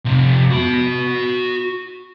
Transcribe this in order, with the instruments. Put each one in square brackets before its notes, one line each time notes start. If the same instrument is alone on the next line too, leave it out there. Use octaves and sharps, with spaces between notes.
[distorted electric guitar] F2 C3
F#4 B5